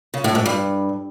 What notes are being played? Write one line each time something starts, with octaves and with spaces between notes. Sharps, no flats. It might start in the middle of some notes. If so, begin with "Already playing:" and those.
C#3
A2
G#2
G2